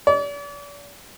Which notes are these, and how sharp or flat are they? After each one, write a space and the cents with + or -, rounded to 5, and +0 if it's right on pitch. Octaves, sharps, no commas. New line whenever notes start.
D5 -40